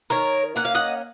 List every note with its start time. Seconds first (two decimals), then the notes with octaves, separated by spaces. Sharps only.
0.10 D#3 A#4 C#5
0.56 A#3 C#4 F#5
0.65 F5
0.75 D#5 F#5